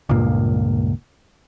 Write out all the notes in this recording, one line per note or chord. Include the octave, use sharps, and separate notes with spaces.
C#2 G2 A#2 A#3